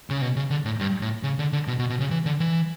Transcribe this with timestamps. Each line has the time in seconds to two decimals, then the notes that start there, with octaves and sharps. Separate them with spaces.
0.10 C#3
0.22 B2
0.36 C#3
0.50 D3
0.65 A2
0.80 G2
1.01 A2
1.23 C#3
1.39 D3
1.53 D3
1.67 B2
1.79 B2
1.90 B2
2.00 C#3
2.11 E3
2.25 D3
2.40 E3